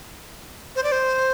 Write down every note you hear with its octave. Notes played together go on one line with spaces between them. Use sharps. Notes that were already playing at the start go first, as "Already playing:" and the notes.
C5
D5
C5